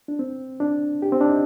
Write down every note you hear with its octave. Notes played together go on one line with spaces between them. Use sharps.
D4
C4
D4
G4
C4
D4
D#4